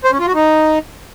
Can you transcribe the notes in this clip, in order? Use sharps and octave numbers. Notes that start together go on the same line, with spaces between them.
C5
C#4
F4
F#4
D#4